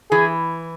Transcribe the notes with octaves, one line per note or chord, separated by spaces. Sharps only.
E3 G#4